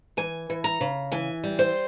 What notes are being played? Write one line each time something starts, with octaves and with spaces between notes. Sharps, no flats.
E3 G#5
E3
A#5
C#3
E3 G#5
G3
C5